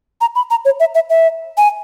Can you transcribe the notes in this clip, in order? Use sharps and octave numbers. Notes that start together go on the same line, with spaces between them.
A#5
B5
A#5
C#5
E5
E5
E5
G#5